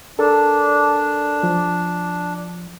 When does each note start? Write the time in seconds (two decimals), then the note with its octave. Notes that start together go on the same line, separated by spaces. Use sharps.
0.19 D4 A4 A#4 A5
1.43 F3